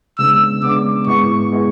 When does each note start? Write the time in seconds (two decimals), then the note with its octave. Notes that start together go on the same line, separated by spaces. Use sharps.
0.18 C#3 G#3 B3 D4 E6
0.62 C#3 G#3 B3 D4 D6
1.07 G#2 G#3 B3 E4 C#6
1.52 G#3 B3 E4